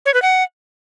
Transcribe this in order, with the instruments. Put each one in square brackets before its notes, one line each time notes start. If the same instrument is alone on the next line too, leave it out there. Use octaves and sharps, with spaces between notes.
[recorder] C#5
B4
F#5